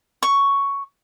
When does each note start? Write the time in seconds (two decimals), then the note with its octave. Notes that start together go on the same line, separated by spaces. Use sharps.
0.23 C#6